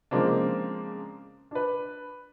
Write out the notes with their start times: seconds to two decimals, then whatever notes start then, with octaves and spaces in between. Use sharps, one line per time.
0.11 C#3 F3 G#3 A#3 C4 D4
1.51 D4 B4